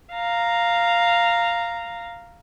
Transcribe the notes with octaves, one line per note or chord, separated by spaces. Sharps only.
F5 A#5